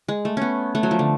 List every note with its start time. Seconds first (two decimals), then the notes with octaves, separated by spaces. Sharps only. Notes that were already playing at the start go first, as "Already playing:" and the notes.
0.08 G#3
0.25 A3
0.37 B3 C#4
0.75 A3
0.83 F#3
0.91 F3
0.99 D3